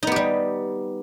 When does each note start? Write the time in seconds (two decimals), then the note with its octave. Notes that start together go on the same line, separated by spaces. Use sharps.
0.03 D#4
0.07 B3
0.12 G4
0.16 G3